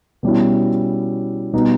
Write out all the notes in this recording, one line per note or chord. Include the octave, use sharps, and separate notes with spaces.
B2 G3 C#4 E4
B2 G3 B3 D#4